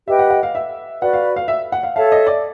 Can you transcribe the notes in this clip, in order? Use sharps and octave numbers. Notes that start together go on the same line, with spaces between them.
G4 B4 D#5 E5 G5
F#5
F#5
F5
E5
F#4 B4 D5 F#5
F5
F5
E5
F#5
F5
A4 C#5 E5 F5 A5
D#5
D5